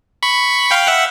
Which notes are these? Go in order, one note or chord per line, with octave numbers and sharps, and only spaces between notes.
B5 C#6
F5 G5
E5 F#5